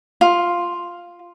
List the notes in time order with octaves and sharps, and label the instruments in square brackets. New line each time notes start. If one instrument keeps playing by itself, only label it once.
[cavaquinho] F4